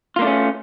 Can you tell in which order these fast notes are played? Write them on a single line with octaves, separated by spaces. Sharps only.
F4 A#3 D4 A3 C#4